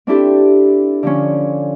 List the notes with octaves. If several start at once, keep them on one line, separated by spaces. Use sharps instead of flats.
C4 D4 E4 G4 A4
D3 F3 C#4